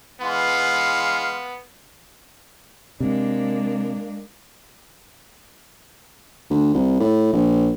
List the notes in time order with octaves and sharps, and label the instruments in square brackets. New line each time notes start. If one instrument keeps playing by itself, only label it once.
[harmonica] E3 G#3 C6 [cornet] B3 [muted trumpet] F5
[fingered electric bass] C3 [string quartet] G#3 A#3 D4
[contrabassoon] D2
C2
A2
A#1